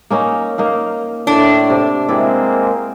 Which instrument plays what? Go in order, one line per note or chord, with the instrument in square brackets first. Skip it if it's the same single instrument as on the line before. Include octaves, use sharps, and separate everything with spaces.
[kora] A#3 C#4 D#4
A#3 D#4 F5
[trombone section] A2 [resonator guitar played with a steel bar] D4
[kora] C3
[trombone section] G#3 A#3 C4 [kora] E4 B4 D5